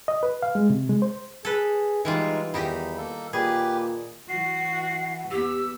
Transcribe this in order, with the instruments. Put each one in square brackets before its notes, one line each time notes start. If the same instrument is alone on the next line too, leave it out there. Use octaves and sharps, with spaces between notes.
[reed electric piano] D#5
B4
F5
G#3
C3
G#3
C5
[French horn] G#4 [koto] A4 B4
[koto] E3 G3 F4 [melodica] G#3 [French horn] D#4
[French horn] E2 [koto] D#3 D#4 G4 [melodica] B5
[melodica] A#3 A4
[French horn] A#2 [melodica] G4 B4 [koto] G#4
[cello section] E3 F#4 [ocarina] F#5 [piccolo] C7
[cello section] E2 B3 [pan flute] G4 [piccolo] E6